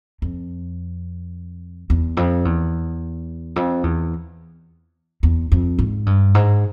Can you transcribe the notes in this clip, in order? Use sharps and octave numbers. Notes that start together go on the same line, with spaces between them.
F2
E2
F2
E2
F2
E2
E2
F2
G#2
G2
G#2